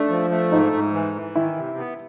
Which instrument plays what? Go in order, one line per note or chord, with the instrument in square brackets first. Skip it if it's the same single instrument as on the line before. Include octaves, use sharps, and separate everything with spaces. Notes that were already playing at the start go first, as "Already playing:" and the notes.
Already playing: [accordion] A3 [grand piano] D4
[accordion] F3
A3
[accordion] G#2 [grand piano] D#4
[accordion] G#2
E3
E3
[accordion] D#3 [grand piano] E4
[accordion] C3
B3